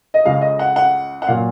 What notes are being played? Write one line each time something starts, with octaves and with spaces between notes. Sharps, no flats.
D#5
C#2 C#3 G#3 F5
D#5
F#5
F#5
F#5
A#2 F#3 F5